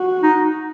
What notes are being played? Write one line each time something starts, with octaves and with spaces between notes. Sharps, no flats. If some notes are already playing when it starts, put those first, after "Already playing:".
Already playing: F#4
D#4